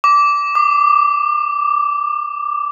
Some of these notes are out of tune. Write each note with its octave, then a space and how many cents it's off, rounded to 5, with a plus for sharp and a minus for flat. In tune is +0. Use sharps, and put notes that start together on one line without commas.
D6 -15
D6 +35